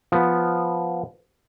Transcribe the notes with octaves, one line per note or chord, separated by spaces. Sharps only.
F3 B3